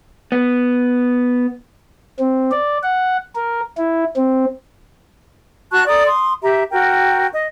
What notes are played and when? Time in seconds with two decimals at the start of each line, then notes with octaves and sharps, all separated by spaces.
0.32 B3
2.19 C4
2.51 D5
2.83 F#5
3.35 A#4
3.77 E4
4.16 C4
5.71 F#4 A5 C#6 F#6
5.86 A4 D5 A#5 D#6
6.06 C6 D#6
6.42 G4 E5 A#5
6.70 F#4 A#4 G5
7.33 D#5